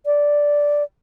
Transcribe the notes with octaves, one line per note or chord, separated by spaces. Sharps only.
D5